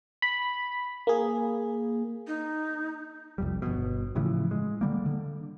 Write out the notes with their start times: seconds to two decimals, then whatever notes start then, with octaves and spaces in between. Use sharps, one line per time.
0.22 B5
1.07 A#3 G#4
2.27 D#4
3.38 C2 F2 G3
3.62 G1 B2
4.15 A2 C#3 E3 F3
4.51 G#3
4.81 D3 G3 A#3
5.06 D3